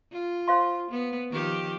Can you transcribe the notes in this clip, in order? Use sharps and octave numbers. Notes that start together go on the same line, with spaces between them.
F4
C5 F5 C6
B3
D#3 F3 G4